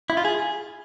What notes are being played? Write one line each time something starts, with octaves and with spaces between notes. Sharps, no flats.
E4
F4
G#4